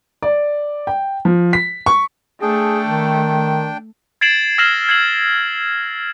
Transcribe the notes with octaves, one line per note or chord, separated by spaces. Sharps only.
D5
G5
F3
B6
C#6
A3 D4 G#4 G5
D#3
G#6 A6 C7 D7 E7 F#7
E6 F6 A#6 C7 E7 F#7
G#6 C7 F#7